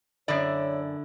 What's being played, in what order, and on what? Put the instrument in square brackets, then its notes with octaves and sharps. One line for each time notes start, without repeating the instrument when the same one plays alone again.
[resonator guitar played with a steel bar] F#2 D5 [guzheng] D3 E4 [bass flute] C#5